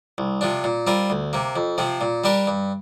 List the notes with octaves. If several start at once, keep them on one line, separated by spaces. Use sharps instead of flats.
C2
C3 F3 D4
A#2
G3 C4 F4 A#4
D2
C3 A#3
F2
C3 F3 C4
A#2
G3 D4 G4 A#4
G2